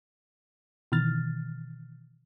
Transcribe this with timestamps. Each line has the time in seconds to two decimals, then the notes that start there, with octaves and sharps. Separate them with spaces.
0.92 B2 D#3 E3 F6 A6